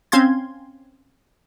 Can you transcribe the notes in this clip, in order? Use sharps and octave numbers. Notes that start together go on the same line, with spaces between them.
C4 C#4 F5 C6 G#6